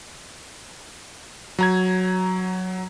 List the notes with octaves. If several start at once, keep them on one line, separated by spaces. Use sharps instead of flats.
F#3 A#5 G#6